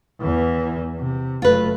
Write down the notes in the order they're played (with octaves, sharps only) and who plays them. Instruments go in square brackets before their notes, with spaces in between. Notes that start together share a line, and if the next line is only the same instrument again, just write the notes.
[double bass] E2 E3
C3
[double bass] F#1 A3 [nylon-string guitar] F4 B4